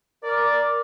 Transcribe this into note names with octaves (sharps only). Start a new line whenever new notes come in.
A#4 D5